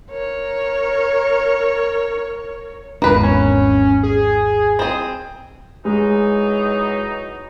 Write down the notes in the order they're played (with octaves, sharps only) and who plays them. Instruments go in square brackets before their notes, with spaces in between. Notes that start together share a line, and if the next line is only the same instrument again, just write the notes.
[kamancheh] A#4 C#5
[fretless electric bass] G#1 E2 D4 [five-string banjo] A#3 B4
[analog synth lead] C#4
G#4
[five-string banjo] C4 G#4
[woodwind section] E3 F#3 D#4 [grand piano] G#3